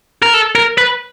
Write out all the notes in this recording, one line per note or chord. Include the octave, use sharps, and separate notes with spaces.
A#4
A4
A#4
B4